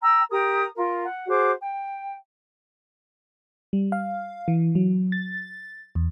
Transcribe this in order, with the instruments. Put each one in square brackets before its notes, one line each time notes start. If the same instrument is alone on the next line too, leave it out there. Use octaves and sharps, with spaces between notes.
[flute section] G5 A#5 E6
G4 A#4 A#5 D#6
F4 A#4
F#5
F#4 G#4 C5 D6
G5
[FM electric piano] G3
F5
E3
F#3
A6
E2